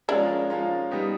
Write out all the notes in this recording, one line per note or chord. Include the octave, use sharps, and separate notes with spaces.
F3 G#3 C#4 D4 E4 F4 A#4
F3 G#3 C#4 F4 A#4
G3 B3 D#4 G4